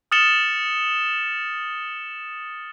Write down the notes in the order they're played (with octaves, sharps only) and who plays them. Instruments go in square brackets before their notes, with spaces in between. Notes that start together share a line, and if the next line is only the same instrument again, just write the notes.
[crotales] D#6 F6 A6 C#7 E7 G7